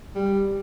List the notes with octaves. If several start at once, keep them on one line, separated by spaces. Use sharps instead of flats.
G3